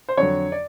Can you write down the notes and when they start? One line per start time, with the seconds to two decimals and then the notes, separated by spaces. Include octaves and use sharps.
0.09 C5
0.17 F2 D3 F#3 C#5
0.52 D5